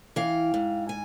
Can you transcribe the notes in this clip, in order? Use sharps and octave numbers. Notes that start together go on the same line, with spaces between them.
E3 F5 G5
G#2
G#5